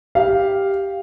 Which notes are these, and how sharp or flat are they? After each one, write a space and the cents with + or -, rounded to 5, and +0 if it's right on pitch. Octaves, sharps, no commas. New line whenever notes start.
G4 +0 F5 +0